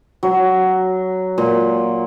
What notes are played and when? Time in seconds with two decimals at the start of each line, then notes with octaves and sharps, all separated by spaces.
0.23 F#3
1.38 A#2